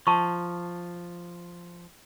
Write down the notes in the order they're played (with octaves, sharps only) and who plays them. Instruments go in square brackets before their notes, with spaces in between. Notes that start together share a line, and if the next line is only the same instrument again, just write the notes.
[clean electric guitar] F3 [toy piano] A5 C#6